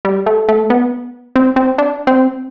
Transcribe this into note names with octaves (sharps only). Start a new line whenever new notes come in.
G3
A3
A3
B3
C4
C4
D4
C4